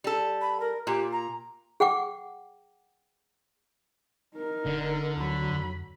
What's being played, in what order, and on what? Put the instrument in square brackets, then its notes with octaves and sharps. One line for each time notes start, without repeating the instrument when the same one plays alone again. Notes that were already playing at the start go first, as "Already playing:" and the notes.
[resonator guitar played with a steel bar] G3 A4
[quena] B5
A#4
[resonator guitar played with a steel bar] A#2 [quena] G4
[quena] A#5
[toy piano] G#4 F#5 G5 D6
[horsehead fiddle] D#4 A#4
[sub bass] E1 [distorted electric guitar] D3
[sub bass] D2 [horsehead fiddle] F#3 B5
[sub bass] F2